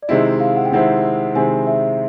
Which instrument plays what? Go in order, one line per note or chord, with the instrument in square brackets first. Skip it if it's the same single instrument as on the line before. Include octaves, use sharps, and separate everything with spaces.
[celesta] D5
[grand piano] C3 D#3 G#3 C4 E4 [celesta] D#5
[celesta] E5
F5
F#5
G5
[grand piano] C3 D#3 G#3 C4 E4 [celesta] F#5
[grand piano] C3 D#3 G#3 C4 E4 [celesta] G#5
[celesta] E5